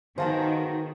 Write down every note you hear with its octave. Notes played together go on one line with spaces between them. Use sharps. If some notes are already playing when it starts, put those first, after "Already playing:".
D#3 B3 F#4 G#4 C5 F5 A5